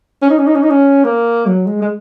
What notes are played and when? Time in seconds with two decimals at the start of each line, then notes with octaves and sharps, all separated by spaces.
0.22 C#4
0.30 D#4
0.38 C#4
0.46 D#4
0.55 C#4
0.62 D#4
0.70 C#4
1.04 A#3
1.46 F#3
1.67 G#3
1.81 G#3